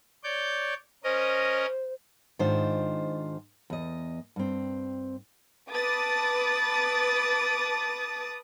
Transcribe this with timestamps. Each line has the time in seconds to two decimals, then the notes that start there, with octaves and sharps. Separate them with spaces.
0.24 C#5 D5 G6
1.04 C#4 A#4 C5 D#5
2.39 G#2 D#3 D4 F4 C5
3.70 E2 D#5
4.36 G2 C4
5.71 B4 A5 D6 D#6 A6